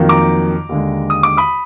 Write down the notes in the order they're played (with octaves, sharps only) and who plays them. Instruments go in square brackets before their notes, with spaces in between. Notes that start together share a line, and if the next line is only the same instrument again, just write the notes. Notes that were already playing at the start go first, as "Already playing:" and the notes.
Already playing: [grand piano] F2 D#3 F#3 A#3
A#5 D6
D#2 D3 G#3
D#6
D6
B5 D#6